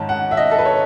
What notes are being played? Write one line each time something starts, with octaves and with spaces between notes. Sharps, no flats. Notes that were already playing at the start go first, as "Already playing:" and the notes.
Already playing: G#2 D#3 C#5 A5
F#5
E5
D#5
A4
B4
C#5